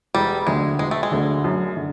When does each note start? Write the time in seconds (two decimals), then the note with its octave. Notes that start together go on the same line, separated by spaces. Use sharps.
0.15 E1 G3
0.47 D2 D3 G#3
0.79 E1 G#3
0.91 A3
1.03 G#3
1.12 D2 D3
1.44 F#2
1.77 D3